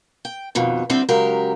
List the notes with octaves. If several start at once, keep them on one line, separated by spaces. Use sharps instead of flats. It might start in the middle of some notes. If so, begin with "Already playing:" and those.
G5
F2 B2 D#3
A2 D3 G3 C4 C5 E5
C#3 F#3 G#3 G4 A#4